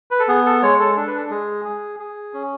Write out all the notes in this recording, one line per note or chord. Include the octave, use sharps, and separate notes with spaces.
B4
A4
B3 G#4
A4
G#3 C#5
A4
D4 A4
B4
A4
G#3 G#4
G#4
G#4
C#4